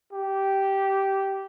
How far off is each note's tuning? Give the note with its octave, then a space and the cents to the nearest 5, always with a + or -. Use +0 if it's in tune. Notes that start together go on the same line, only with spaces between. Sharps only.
G4 -10